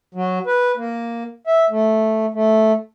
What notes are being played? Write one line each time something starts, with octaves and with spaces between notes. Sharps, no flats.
F#3
B4
A#3
E5
A3
A3